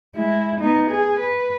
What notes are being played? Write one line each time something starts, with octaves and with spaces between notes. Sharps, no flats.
G#3 E4
B3 D#4
G#4
B4